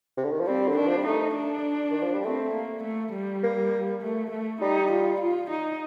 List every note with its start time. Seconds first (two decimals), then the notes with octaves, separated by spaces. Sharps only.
0.17 C3
0.24 D3
0.32 D#3
0.40 F3
0.47 G3 C4
0.68 D3
0.77 D#3 D4
0.88 F3
0.97 G3
1.06 A3 D#4
1.36 D4
1.91 D#3
2.02 F3
2.14 G3
2.25 A3 C4
2.54 A#3
2.84 A3
3.14 G3
3.43 A#3
4.02 A3
4.32 A3
4.61 G3 D#4
4.92 F4
5.21 F4
5.51 D#4